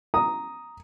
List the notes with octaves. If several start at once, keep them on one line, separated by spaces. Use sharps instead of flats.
A#5 D#6